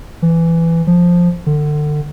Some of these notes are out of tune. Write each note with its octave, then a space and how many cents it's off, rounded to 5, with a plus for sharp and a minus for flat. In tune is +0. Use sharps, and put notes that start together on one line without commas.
E3 +15
F3 +5
D3 +30